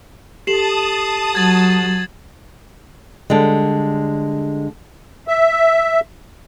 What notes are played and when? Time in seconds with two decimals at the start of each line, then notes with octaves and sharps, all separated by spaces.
0.47 G4 A4 A5 D#6 C7 E7 F#7
1.35 F#3 G#6 A6 F#7
3.30 D3 G3 G#3
5.28 E5